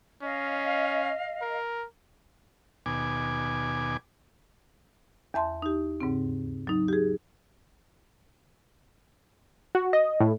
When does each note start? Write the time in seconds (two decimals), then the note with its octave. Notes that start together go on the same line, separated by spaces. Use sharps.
0.23 C#4 D#5 F5
1.42 A#4
2.86 D#2 B2 G#5 D6
5.34 E2 E5 A5 C6
5.62 D#4 G4
6.01 D#2 G#2 C#3 C4
6.67 F#3 D#4
6.88 G4 G#4
9.75 F#4
9.93 D#5
10.20 A2